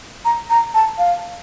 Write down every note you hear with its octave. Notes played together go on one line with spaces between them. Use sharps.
A#5
A#5
A5
F5